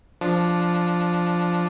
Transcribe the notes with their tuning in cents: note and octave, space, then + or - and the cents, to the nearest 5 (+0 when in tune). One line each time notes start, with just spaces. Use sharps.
F3 +0 D4 +0